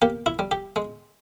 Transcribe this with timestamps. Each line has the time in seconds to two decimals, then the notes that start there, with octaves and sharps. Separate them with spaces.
0.02 A#3 G4
0.26 E4
0.39 G3
0.51 G4
0.76 G#3